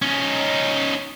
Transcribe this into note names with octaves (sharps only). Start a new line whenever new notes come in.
C#4 D#4